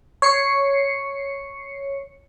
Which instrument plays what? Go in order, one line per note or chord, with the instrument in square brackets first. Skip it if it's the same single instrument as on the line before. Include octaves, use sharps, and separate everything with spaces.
[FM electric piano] C#5 C7 C#7